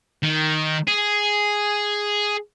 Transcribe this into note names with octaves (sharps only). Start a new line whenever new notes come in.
D#3
G#4